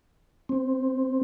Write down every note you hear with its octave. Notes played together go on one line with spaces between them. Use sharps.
C4